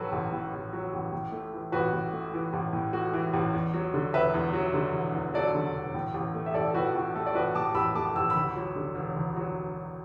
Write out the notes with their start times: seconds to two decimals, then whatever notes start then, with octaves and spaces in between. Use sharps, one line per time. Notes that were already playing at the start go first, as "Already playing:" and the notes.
Already playing: A1 A2 F#3 F#4 A4 B4
0.12 A1
0.32 A2
0.53 A1
0.73 F#3
0.93 A1
1.12 A2
1.32 A3
1.53 E3
1.72 A1 F#4 B4
1.93 A2
2.13 A3
2.34 E3
2.53 A1
2.73 A2
2.93 A3 F#4
3.13 E3
3.34 A1
3.53 E2
3.74 F#3
3.94 D3
4.14 E1 B4 E5
4.34 E2
4.53 F#3
4.74 D3
4.94 E1
5.15 E2
5.34 F#3 A4 D5
5.55 D3
5.75 E1
5.94 A2
6.14 A1
6.35 A3
6.46 E5
6.54 A1 A4 D5
6.70 A4
6.74 A2 F#4 B4
6.94 A1 F#4
7.16 A3 A4
7.26 D5
7.34 A1 F#4 B4
7.55 A2 A5 D6
7.75 A1 B5 E6
7.95 A3 A5 D6
8.16 A1 E6
8.30 B5 E6
8.36 D2
8.56 F#3
8.76 D3
8.95 E1
9.16 D2
9.36 F#3